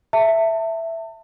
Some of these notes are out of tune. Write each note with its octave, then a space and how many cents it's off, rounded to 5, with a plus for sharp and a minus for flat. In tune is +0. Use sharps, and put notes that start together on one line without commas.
E5 +0 A5 +35